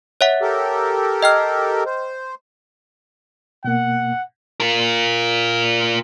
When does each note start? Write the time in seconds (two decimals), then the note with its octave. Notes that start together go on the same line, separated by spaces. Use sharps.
0.21 C#5 E5 F#5
0.42 G4 A4 A#4
1.22 D#5 G5 F6
1.86 C5
3.64 B2 A#3 F#5
4.60 F4 A#4